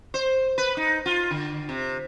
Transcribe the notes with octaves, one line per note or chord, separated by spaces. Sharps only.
C5
B4
D#4
F4
D3
C3